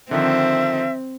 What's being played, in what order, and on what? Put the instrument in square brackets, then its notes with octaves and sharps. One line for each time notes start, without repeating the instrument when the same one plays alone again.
[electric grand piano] D3 D#3 F3 [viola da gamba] C4 [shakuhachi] E5